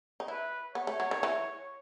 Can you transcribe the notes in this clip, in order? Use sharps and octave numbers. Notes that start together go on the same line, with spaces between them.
D#4
E4 B4
B3 C#5
A3
F#3
D#3
E3